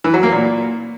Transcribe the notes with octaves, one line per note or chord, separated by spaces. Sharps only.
E3
F#3
A#3
A#2